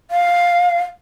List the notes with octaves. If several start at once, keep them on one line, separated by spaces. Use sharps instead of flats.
F5